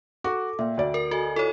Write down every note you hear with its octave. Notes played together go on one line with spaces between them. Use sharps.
F#4 A4 D6
A#2 E5 G5
D2 D5
A#4
F#4 A4 D#5 G#5
E4 F4 A4 C#5